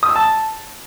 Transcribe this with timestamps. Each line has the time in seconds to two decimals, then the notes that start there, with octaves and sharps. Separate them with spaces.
0.03 D#6
0.09 E6
0.16 A5